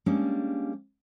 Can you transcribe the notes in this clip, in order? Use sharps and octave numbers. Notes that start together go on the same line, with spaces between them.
G3 G#3 A#3 C#4 D4